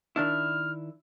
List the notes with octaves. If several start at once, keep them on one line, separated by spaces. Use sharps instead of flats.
D#3 D4 E4 F6